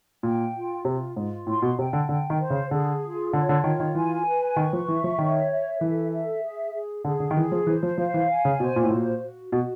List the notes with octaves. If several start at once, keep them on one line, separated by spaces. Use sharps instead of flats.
A#2 G5
F4
C3 F4
G#2 F4
A2 C6
B2
C3 G5
D3
D3 G5
D#3
C5
C#3
D3 G#4
F4
D3 C#5
D3
D#3 F4
D#3
E3 G#5
B4
D#3 C#6
F3
E3 E5
F3
D#3 C#5
E5
E3 A4
E5
G#4
G#4
D3 G#4
D3
D#3
E3 G#4
F3
E3 C5
F3
F3 F5
E3
G#5
C#3
B2 C5
A#2
A2
A#2 F#4
F#4
B2 F#4